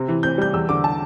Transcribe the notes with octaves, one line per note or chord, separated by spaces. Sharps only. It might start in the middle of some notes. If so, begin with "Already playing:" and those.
Already playing: C3 C4
E3
C4 G6
G3 G6
E2 E6
D3 D6
A5